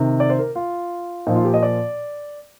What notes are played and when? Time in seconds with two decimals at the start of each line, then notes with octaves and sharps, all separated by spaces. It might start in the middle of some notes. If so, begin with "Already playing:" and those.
Already playing: C3 D#3
0.20 D5
0.30 C5
0.39 A#4
0.55 F4
1.27 A#2 F3 D#4
1.36 F4
1.45 G4
1.54 D#5
1.63 D5